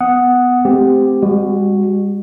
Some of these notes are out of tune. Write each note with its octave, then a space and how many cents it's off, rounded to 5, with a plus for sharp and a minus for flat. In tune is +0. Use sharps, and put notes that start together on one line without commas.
B3 +10 F#5 +0 D#6 +5
A3 -40 C4 -20 G4 +0
G3 +45 F#4 +0